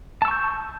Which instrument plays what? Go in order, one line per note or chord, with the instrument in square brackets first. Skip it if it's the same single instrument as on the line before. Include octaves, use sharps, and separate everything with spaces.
[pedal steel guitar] A5
E6
C#6
G6